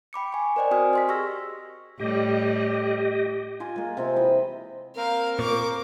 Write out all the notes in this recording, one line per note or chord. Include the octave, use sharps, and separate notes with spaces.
G5 B5 D6 C#7
G#5 C#6
A#4 C5 D5 D#5 G5
C4 F#4 C5 G#5 D#6 F6
D#5 C6 B6
G4 G#4 C#6 E6 F6 A#6
A2 G3 G4 D#5
F4 G#5 C6
G#3 A#3
C3 C4 F4 G5
E3 D#5 B5
A#3 C4 A#4 F5
A#2 C#6 D6